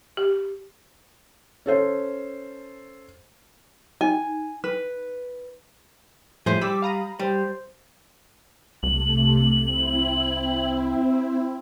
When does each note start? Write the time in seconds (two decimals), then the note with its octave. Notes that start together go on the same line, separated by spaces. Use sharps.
0.17 G4
1.66 C#4 A4 C5
4.01 D#4 G#5
4.64 B4
6.46 A2 F3 G3 G#4 C5 E5
6.61 G3 B5 D6 E6 B6
6.82 F5 A#5 B5 D#6
7.19 G3 C5
8.83 C2 C3 A3 F#7
9.61 C4 E4